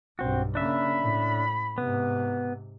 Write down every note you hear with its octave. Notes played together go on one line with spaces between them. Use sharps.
B1 G2 C4 F#4
C#3 A#3 D4 E5 B5
A2
G#2 C3 B3